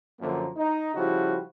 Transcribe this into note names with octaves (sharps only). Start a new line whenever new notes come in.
F#2 D3 F3 A#3
D#4
C#3 F3 G3 E4 F#4